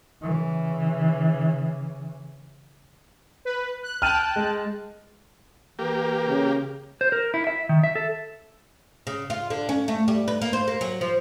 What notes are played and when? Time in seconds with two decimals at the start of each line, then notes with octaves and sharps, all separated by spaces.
0.22 C#3 E3
3.45 B4
3.83 F#6
4.02 G5 A5 F6 F#6 D#7
4.36 G#3
5.79 E3 A#3 G4
6.28 C#3
7.01 C5
7.12 A#4
7.34 E4
7.47 E5
7.69 D#3
7.84 E5
7.95 A4
9.07 C#3
9.30 F4
9.50 D3
9.69 C#4
9.88 A3
10.08 G3
10.28 B4
10.42 A#3
10.53 C5
10.68 A#3
10.81 F#3
11.01 F3